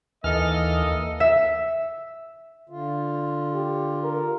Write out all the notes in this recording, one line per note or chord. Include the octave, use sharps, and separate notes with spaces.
D#2 E3 A#3 A4 D#5 F6
E5
D3 F4
G4
A#4